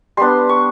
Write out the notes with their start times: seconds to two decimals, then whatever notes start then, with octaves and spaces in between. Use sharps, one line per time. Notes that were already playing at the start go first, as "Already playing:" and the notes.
0.17 G3 B3 D4 C6
0.49 C#6